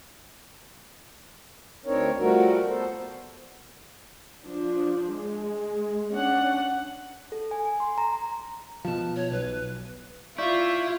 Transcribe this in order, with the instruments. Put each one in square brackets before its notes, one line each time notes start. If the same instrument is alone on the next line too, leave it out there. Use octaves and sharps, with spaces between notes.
[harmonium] D2 C4 D4 D#4 A#4 C#5
F3 G3 A3 F#4 A#4
B3 A4 C5
[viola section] F3 D4
G#3
C#4 D4 F#5
[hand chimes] A4
G#5
G#5
C6
A#5
[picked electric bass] B2 F3 [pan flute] A5
[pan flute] C#5
[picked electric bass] B1 [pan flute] B4
[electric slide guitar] E4 [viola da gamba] F4 [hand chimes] D5 C#6 G6